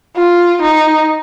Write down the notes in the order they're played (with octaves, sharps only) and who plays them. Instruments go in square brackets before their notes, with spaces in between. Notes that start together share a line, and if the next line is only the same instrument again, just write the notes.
[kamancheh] F4
D#4